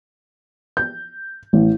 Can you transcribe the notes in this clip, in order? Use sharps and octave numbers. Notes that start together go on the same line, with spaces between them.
G6
A1